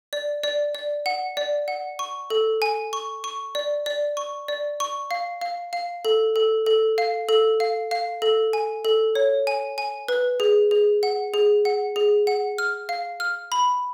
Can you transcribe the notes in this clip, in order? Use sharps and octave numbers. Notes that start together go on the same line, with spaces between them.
D5
D5
D5
F#5
D5
F#5
C#6
A4
G#5
C#6
C#6
D5
D5
C#6
D5
C#6
F5
F5
F5
A4
A4
A4
F5
A4
F5
F5
A4
G#5
A4
C#5
G#5
G#5
B4
G#4
G#4
F#5
G#4
F#5
G#4
F#5
F6
F5
F6
B5